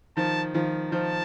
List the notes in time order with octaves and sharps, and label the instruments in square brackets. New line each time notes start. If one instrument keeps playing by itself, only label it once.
[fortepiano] D#3 F3 [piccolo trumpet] A5
[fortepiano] D#3 F3
[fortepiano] D#3 F3 [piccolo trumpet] A5